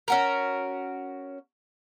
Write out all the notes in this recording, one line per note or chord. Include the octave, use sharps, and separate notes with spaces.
C#4 F#4 A#4